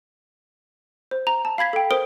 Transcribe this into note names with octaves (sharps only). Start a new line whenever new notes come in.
C5
A#5
A5
F5 B5 G#6 B6
A4 G5
A#4 C5 D#6 D7 G7